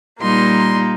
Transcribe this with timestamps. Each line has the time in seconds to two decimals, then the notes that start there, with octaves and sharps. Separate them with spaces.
0.20 A#2 G3 A#3 D#4 C6